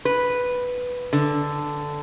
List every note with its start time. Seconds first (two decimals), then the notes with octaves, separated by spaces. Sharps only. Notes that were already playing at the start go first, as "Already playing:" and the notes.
0.05 B4
1.13 D3